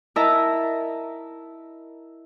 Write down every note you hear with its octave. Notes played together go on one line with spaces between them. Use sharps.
E4 A#4 D#5 E5 A5 A#5